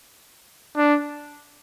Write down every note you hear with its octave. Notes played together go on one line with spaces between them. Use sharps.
D4